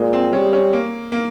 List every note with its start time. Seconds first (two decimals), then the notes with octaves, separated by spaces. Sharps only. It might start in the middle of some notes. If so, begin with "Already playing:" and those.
Already playing: A#2 G#3
0.13 C4
0.33 G3 C#4
0.53 C#4
0.73 A#3
1.12 A#3